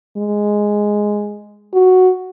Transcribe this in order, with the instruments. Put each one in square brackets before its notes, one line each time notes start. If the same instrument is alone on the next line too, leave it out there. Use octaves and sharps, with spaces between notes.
[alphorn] G#3
F#4